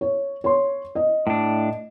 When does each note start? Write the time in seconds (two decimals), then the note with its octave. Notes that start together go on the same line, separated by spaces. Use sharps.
0.01 C#5
0.44 C#5 C6
0.95 D#5
1.27 A2 D4